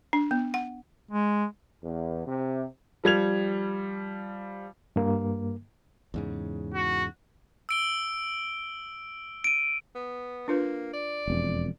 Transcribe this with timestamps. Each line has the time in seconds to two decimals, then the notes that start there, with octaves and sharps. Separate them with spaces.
0.13 D4
0.31 B3
0.54 F#5
1.11 G#3
1.83 E2
2.26 C3
3.04 F3 G3 G#6 F7
4.96 G2 A#3
6.14 E2 G#2 C#3
6.74 F#4
7.69 E6 D7 G7
9.44 D7 D#7
9.95 B3
10.48 A#3 D4 F4 B4
10.93 D5
11.28 E1 F2